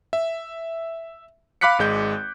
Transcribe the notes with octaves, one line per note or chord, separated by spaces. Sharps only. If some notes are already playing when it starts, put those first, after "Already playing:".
E5
F5 B5 D6 F#6 B6 C#7
G#1 G#3 G6